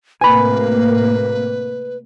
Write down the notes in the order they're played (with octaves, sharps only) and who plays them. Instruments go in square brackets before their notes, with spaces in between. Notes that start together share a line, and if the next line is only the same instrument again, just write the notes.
[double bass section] A2 C3 A#3 [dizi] B4 [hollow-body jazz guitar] G#5 B5